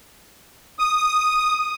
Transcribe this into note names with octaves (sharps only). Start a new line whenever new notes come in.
D#6